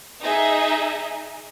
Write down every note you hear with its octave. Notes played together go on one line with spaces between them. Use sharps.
D#4 G#4 D#5 E5